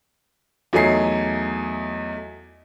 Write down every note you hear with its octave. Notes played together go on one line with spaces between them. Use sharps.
E2 F#3 A3 D#4 G#5 C7